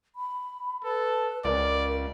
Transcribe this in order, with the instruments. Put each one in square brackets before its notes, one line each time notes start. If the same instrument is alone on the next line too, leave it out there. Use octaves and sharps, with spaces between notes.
[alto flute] B5
[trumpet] A4 [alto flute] B4
[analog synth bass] C#2 [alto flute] A#4 [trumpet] D5